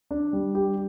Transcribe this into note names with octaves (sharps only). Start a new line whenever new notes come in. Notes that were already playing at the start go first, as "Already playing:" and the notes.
D4
G3
G4